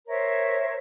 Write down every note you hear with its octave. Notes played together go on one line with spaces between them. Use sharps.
A#4 C5 C#5 E5